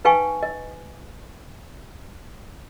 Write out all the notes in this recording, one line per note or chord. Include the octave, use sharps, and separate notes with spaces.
D#4 B4 F5 G5 G#5 C#6
D#5